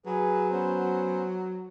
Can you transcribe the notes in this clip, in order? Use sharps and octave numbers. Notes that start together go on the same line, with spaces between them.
F#3 G#4 B4
B3 C#4 C5